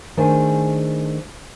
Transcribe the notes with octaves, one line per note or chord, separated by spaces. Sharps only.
D#3 A3 D4 G#4 C5 G#5